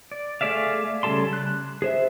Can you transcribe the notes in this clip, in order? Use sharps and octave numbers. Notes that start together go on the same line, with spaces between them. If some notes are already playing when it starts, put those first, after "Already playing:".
D5
A3 G#4 D5 E5 F5
C#3 G3 A4 A5 C6
F#6
G#4 C5 E5